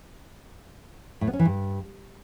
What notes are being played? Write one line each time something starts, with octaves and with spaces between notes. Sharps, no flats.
A2
B3
C#4
E3
G2